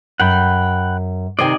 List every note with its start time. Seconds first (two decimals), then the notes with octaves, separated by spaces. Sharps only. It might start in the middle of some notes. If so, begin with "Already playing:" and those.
0.20 F#2 F#5 G5 B5
1.39 C3 D#3 C5 D5 D#5 G#5